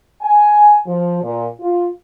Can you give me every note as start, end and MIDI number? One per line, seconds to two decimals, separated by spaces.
0.22 0.76 80
0.87 1.19 53
1.23 1.46 46
1.61 1.87 65